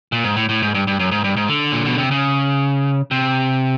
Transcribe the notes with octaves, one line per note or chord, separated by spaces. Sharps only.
A#2
G#2
A2
A2
G#2
G2
G2
F#2
G#2
G2
G#2
D3
A#2
B2
C3
C#3
C3